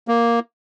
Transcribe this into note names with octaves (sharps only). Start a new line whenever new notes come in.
A#3